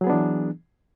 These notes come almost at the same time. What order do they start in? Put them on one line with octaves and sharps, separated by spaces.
F#3 G#4 B3 D4 E3